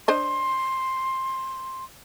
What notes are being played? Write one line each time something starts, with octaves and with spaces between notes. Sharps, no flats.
D4 C5 D#5 C6